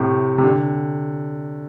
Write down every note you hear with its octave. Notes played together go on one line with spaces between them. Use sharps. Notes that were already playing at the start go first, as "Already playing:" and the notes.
Already playing: A2 C3
C3
D3